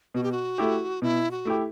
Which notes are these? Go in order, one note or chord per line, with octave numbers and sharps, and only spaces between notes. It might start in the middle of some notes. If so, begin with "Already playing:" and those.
B2 F#4
G4
F#4
A3 E4 G4
B2 E4
F#4
A3 E4 G4